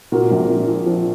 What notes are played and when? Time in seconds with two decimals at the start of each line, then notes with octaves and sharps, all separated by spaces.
0.12 A#2 F#4 A#4
0.31 A#1
0.49 A#2
0.68 F3
0.86 F3